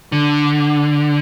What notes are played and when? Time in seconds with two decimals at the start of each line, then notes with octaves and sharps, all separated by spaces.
0.12 D3